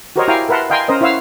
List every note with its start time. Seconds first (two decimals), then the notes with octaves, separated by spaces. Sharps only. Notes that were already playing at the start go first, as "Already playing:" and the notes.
0.16 F#4 G4 A#4 C5 C#5 D#5
0.28 E4 G4 F5 G5 G#5 A#5
0.49 A#4 B4 E5 F#5 A5 C6
0.70 D#5 F5 G5 G#5 A#5 C6
0.88 C#4 A#4 C5 D#5
1.01 E4 C5 C#5 F5 F#5 E6